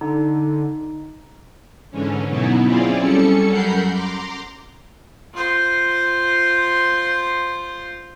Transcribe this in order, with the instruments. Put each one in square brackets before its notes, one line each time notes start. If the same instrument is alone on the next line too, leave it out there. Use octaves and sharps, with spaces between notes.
[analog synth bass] D3 [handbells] D#4
[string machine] G#2 D3 E3 C#4
F#2 B2 F#3 B3 D#4 E4
C4 C#4 E4 F4 G#4 D5
G3 C#4 A4 C#7
F#2 A#4 F#5 B5 G6 C7
A#5 C6 D6
[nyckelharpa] F4 C5